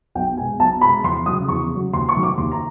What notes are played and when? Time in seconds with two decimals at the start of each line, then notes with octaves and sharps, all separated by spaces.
0.15 B1 G5
0.37 B2 G#3 G#5
0.59 B1 A5
0.81 B2 G#3 B5
1.04 E2 C6
1.26 C#3 F#3 D#6
1.48 E2 C#6
1.71 C#3 F#3
1.93 D#2 C6
2.09 C#6
2.15 D#3 F#3 A3
2.23 D6
2.38 D#2 C6
2.52 A#5